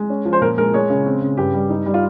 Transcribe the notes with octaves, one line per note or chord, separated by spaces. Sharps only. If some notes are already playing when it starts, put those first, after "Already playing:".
Already playing: G#3
C#4
F3
C5
A#2 A#4
G#3 A#4
G#3 C#5
C#3
C4
C#3
G2 G4
G3
D#4
G3
F4